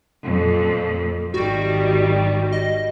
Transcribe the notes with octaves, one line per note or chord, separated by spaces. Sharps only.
F2 A#2
G#1 D#3 G3 F#4
D#5